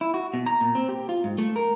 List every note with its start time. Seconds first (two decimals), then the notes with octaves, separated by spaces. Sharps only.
0.01 E4
0.14 F#4
0.34 B2
0.46 A#5
0.61 A#2
0.75 C4
0.89 G4
1.09 F4
1.24 G#2
1.38 A3
1.56 A#4